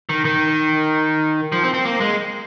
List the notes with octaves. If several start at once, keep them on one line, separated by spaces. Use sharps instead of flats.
D#3
D#3
F3
C4
C4
A#3
G#3